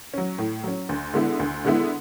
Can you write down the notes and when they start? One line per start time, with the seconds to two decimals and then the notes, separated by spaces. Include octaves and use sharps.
0.14 F#3 C#4
0.38 A2
0.63 F#3 C#4
0.89 D2
1.14 D3 G#3 B3 E4
1.39 D2
1.65 D3 G#3 B3 E4